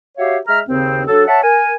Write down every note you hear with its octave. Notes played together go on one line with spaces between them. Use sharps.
F#4 G4 C#5 E5 F5
G#3 E5 A#5 F6
D#2 C#3 C4
F#3 D4 A4
C#5 E5 F#5 A5
A#4 G#5